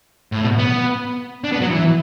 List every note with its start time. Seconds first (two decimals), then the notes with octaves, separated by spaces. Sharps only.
0.32 A2
0.42 B2
0.59 B3
1.44 D4
1.52 B3
1.61 F#3
1.70 E3